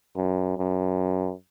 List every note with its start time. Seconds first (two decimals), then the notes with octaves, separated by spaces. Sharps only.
0.16 F#2
0.58 F#2